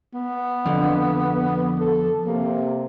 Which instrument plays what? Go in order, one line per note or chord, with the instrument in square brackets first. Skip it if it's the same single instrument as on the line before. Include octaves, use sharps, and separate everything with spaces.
[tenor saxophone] B3
[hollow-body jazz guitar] F2 D3
[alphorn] A4
[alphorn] C3 [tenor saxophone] A#3